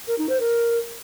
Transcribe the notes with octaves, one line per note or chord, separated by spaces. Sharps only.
A#4
D#4
C5
A#4